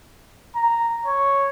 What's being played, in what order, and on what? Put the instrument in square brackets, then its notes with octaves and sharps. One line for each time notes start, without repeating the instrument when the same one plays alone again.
[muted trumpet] A#5
C#5